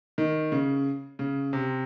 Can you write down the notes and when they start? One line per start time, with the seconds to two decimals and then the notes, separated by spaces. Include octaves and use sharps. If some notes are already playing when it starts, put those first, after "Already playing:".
0.18 D#3
0.52 C#3
1.19 C#3
1.53 C3